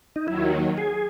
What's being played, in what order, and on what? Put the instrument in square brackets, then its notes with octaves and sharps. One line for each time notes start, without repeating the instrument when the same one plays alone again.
[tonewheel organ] D#4
[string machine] D#2 D#3 F#3 [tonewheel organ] E4
[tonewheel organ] G#4